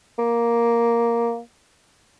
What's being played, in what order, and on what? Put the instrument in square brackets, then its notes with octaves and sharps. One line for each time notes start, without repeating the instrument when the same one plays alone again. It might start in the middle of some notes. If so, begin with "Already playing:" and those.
[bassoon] A#3